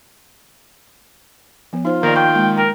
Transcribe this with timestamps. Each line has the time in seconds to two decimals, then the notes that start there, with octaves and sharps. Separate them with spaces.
1.73 F3 B3
1.85 D#4 F4 C5
2.03 D#3 A#3 A#4 D5
2.16 G5 C#6
2.35 G#3 A#3
2.57 A#4 G5